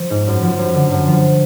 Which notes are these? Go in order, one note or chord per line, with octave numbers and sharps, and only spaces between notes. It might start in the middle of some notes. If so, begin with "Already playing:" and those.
Already playing: F3
G#2
F#2
F3
F#2
D3
F#2
F3